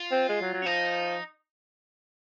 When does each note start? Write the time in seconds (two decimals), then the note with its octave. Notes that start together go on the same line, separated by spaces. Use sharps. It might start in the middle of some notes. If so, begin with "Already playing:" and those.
Already playing: F4
0.11 C4
0.29 G#3
0.41 F#3
0.53 F#3
0.62 C#4
0.65 F3 D#4